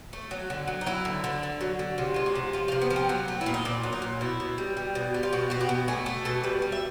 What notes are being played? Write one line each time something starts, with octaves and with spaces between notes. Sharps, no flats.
A3
F#3
D3
F#3
D#4
F#3 E4
D3
D3
D3
F#3
D3
C3 F4
G#3 F4
F#4
C3
F3 F4
F4
C3
B3
F3
C4
F#3 B3
A3
E4
A#2
D#4
A#2 D4
F#3
D#4
A#2
B2 E4
B2
G3
G3
B2
G3
F4
B2 F#4
B2 F#4
G4
B2
A3 G#4
A3
B2 A4
G3 B4
G3
E5